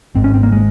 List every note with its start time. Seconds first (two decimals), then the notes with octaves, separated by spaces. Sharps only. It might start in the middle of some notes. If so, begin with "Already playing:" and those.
0.15 G#1 G#2 C4
0.24 C#4
0.34 C4
0.43 A#3
0.52 G#3